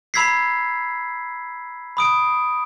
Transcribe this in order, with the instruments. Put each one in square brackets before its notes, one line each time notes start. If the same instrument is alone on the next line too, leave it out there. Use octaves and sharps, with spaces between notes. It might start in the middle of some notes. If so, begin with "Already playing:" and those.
[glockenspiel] A#5 B5 E6 G#6 B6 C7
B5 D#6 D7